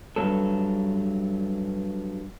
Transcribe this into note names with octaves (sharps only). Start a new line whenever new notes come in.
G2 F#3 A4